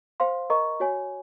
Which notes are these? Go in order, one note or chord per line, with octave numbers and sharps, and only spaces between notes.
C5 F5 C6
A#4 D#5 A#5 C#6
F#4 C#5 G#5